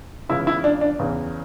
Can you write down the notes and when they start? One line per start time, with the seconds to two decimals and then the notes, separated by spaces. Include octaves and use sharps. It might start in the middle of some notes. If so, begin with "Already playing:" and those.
0.29 C#2 C#3 E3 E4
0.47 E4
0.64 D4
0.81 D4
0.99 E2 C#3 E3